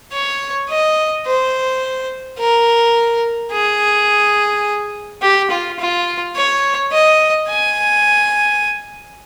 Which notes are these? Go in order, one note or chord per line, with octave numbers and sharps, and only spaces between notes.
C#5
D#5
C5
A#4
G#4
G4
F4
F4
C#5
D#5
G#5